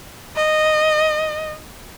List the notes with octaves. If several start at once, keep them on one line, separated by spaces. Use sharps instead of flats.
D#5